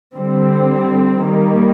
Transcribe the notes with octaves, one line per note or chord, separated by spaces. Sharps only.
D3 G3 C4
D#3 G3 A#3